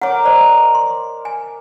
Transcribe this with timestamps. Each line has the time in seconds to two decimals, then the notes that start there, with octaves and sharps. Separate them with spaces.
0.01 A#4 C#5 F#5 D6
0.25 C5 D5 D#5
0.75 C6
1.25 G#5